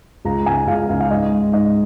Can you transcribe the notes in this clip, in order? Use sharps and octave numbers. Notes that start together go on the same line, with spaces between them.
C#2 A#5
C#2 G#5
C#2 F5
C#2 F5
F5
G#2 D#5
G#3
G#2 D#5